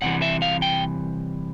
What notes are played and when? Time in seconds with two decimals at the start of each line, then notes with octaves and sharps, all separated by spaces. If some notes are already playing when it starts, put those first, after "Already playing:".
0.02 C2 C3 E3 F#5
0.22 E5
0.42 F5
0.62 G5